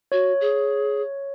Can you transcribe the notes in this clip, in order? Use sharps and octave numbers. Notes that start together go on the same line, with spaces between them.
F#4 C#5
G#4